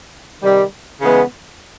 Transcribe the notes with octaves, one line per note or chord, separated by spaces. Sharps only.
C3 D#3 G3
C#3 E3 G#3 B3